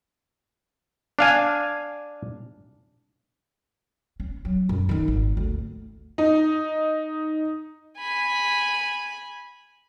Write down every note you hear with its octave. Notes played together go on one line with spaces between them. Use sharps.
D4 F5 G#5
C#4
F#3
F#2
D#3 D#4
G#1
D2
D#4
G#5 B5